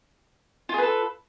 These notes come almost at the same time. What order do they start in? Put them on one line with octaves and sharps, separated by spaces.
F4 G#4 B4 A4